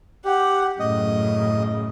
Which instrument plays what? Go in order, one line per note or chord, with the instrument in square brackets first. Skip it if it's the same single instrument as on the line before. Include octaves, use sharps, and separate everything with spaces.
[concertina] G4 [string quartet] F#5
[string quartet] F#2 A2 C#3 [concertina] D#5